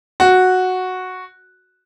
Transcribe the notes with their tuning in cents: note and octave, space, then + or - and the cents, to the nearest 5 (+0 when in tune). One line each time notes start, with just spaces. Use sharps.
F#4 -5